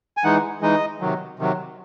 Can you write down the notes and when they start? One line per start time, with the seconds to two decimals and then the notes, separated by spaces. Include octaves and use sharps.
0.17 G#5
0.24 E3 G#3 D#4 F#5
0.62 E3 G#3 D#4 D#5
1.01 C3 D#3 F#3
1.39 C3 D#3 F#3